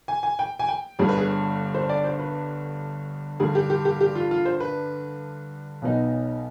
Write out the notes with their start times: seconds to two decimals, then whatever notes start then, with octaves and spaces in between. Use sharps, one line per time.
0.08 G#5
0.23 G#5
0.39 G5
0.59 G#5
0.69 G5
0.99 G1 G2 D3 G3 G#4
1.09 B4
1.18 G#4
1.75 C5
1.89 D5
2.04 C5
2.19 B4
3.40 G2 D3 G3 G#4
3.55 G4
3.70 G4
3.85 G4
4.01 G4
4.15 F4
4.31 F4
4.45 C5
4.60 B4
5.82 B1 B2 B3 D#4